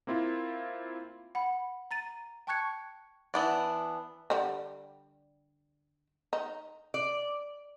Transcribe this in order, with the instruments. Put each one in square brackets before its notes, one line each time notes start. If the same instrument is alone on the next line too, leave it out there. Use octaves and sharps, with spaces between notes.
[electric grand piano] A#3 C4 E4 F4
[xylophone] F#5 B5
A#5 A6 D#7
G5 A5 C#6 F#6 G#6 C#7
[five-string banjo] E3 B3 D4
[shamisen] D3 G3
D#4
[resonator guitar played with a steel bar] D5